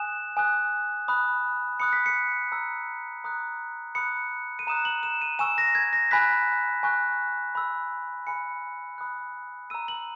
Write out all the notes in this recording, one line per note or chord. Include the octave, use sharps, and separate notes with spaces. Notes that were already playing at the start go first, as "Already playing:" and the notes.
Already playing: G#5 D#6 F#6 E7
G#5 D#6 F#6
B5 D#6 F#6
B5 D#6 F#6 C#7
B6
C#7
A#5 E6
A#5 D#6 F#6
B5 D#6 F#6 C#7
D#7
A#5 D#6 F#6 E7
F#7
E7
D#7
G#5 C#6 E6 E7
A#6
G#6
A#6
G#5 B5 F#6 B6
G#5 C#6 F#6
B5 E6
G#5 B5 F#6 C#7
B5 D#6 F#6
A#5 E6 D#7
F#7